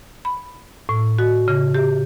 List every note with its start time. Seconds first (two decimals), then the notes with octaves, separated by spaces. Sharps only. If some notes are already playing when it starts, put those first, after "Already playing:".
0.25 B5
0.89 A2
1.18 F#4
1.48 C#3
1.75 G4